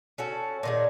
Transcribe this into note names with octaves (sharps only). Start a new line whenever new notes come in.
C#4 F#4 A4
A#2 D#3 G#4